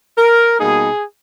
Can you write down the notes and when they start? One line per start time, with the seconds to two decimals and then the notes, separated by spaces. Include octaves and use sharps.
0.17 A#4
0.59 B2 G3 A#3 D#4 G#4